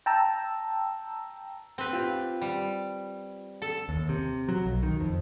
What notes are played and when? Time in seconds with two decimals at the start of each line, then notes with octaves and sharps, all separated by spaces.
0.06 G5 A5 A#5 E6
1.78 C4 B4
1.93 F4 G4
2.42 G3
3.62 A4
3.89 D#2
4.09 C3
4.49 F#3
4.66 B1
4.83 D#3
5.00 F2